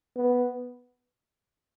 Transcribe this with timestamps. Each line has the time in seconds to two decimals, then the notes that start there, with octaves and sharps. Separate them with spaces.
0.16 B3